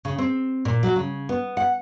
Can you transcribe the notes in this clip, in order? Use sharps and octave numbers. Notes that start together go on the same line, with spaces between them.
C#3
C4
A#2
F#3
C#3
B3
F#5